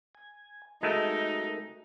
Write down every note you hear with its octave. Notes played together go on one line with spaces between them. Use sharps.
G#5
G#3 A3 D#4 F#4 A#4